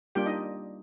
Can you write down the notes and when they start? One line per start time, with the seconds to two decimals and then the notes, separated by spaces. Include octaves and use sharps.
0.15 G3 A#3 D4 F4 G4 G5
0.26 D#4 D#5